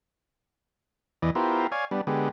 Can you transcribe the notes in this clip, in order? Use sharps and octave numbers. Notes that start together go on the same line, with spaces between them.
E2 E3 D5 D#5
B3 E4 F4 G4 A#4 C5
C#5 D5 F5 G#5
G3 B3 D4
D3 G#3 B3 G4